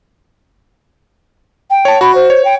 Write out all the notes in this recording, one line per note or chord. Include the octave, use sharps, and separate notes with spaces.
G5
C#5 A5
F#4 B5
C5
C#5
G5